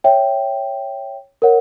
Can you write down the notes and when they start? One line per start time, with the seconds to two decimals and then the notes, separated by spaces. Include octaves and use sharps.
0.04 C#5 E5 G5
1.42 A#4 C#5 F#5